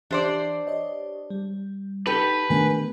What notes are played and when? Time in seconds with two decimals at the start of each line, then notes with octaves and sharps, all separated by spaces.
0.11 E3 D4 G4 C5 D5 E5
0.67 G4 C#5 D#5
1.30 G3
2.07 D#4 G4 A4 B4
2.50 D#3 A3 B3 D4 A#4 G#5